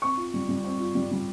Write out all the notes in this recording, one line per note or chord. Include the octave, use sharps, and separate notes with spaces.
C4 C#6
F4
G3
G3
C4
F4
G3
G3